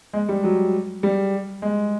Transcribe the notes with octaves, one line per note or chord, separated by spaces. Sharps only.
G#3
G3
F#3
G3
G#3